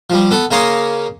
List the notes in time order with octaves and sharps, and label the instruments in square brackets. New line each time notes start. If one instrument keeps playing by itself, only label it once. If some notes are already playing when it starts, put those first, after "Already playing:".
[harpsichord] F3 G3
B3 A4
C#3 A#3 C#5 A#5 C6 D#6